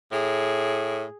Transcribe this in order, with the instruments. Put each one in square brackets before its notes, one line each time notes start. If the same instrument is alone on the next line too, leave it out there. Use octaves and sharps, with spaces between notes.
[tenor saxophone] A2 [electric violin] G#4